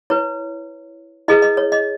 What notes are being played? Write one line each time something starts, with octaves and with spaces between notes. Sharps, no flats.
E4 B4 C#5
E4 G#4 B4 D#5
D#5
C#5
D#5